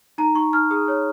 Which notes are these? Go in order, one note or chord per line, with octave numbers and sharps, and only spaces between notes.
D#4 A#5
D#4 C#6
D#4 F6
G#4 D#6
C#5